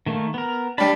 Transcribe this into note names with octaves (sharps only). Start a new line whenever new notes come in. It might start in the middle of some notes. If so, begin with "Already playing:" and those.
D#3 A3 A#3
B3 A#4
G3 D4 A5 B5